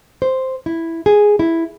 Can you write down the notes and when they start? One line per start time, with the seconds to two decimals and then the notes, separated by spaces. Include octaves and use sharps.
0.22 C5
0.66 E4
1.06 G#4
1.39 E4